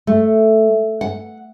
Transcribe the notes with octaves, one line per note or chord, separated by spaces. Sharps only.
A3
F#5